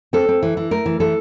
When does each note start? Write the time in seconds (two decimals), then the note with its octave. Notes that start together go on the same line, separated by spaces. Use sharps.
0.13 C4 A4
0.29 C4
0.43 E3
0.57 E3
0.71 A3 A#4
0.86 E3
1.00 E3 A4